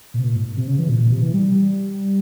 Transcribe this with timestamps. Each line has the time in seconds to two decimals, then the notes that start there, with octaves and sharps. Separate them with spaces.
0.14 A#2
0.19 C3
0.24 A#2
0.35 G#2
0.57 C3
0.67 C#3
0.79 E3
0.89 A#2
1.00 A#2
1.11 C3
1.22 E3
1.34 G3